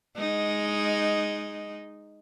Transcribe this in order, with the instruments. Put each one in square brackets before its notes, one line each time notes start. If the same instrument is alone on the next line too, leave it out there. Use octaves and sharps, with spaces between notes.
[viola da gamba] G#3 D#4